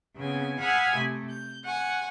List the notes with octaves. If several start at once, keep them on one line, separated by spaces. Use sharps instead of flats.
C#3 B3 C4 G#5
F5 F#5 G#5 B5 D#6 E6
C3 A3
G6
F#5 G#5 C#6